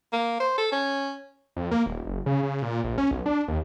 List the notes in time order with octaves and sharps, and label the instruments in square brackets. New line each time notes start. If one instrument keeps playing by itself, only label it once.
[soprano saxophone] A#3
C5
A4
C#4
[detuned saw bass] F2
A#3
D#1
F#1
C#3
C#3
A#2
A#1
C#4
B1
D4
D#2